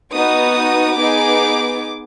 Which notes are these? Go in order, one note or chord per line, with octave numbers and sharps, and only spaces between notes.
B3 D#4 F#4 D#6
B3 D#4 G#4 D6